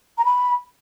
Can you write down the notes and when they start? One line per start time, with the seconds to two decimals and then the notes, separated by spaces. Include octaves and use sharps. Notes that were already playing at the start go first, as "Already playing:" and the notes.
0.18 A#5
0.25 B5